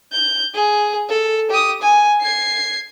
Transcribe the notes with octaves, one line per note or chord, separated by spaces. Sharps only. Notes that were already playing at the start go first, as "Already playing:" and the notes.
G6
G#4
A4
G4 D#6
G#5
G#6 C7